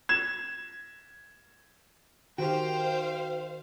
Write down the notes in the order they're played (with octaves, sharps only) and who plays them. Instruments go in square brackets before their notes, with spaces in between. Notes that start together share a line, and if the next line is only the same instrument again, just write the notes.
[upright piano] G#6 E7
[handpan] D#3 [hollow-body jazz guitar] F#4 G4 [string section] C5 F5 [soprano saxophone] G5